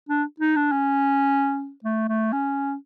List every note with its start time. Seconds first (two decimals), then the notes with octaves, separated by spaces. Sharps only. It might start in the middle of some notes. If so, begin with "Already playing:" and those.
0.09 D4
0.40 D#4
0.56 D4
0.72 C#4
1.84 A3
2.08 A3
2.32 C#4